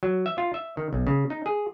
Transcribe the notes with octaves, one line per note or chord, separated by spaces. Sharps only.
F#3
E5
F4
E5
D#3
B1
C#3
D#4
G#4